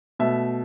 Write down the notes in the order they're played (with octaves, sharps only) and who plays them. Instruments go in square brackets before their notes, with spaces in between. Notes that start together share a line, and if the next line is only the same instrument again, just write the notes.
[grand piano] B2 A3 E5